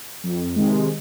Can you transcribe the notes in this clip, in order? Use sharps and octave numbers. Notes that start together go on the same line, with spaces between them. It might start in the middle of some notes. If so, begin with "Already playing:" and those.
F2
C3 D#3 G#3